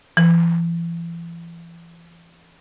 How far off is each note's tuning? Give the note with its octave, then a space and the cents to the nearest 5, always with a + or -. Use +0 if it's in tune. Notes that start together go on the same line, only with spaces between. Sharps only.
E3 +40